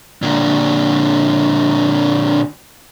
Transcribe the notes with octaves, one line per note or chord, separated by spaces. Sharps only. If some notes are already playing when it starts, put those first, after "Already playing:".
A#2 D3